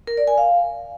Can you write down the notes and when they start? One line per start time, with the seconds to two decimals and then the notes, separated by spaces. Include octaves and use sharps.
0.07 A#4
0.17 D5
0.27 G#5
0.37 F5